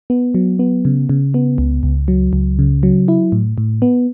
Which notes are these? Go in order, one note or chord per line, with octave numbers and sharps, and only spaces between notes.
B3
F#3
B3
C#3
C#3
B3
C#2
C#2
F#3
C#2
C#3
F#3
E4
A2
A2
B3